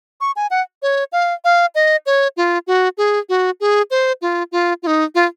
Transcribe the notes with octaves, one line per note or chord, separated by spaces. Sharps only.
C#6
G#5
F#5
C#5
F5
F5
D#5
C#5
F4
F#4
G#4
F#4
G#4
C5
F4
F4
F4
D#4
F4